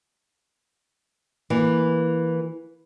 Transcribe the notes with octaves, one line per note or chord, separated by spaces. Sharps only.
E3 A#3